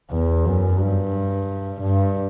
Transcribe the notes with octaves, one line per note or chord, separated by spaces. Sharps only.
E2
F#2
G2
G2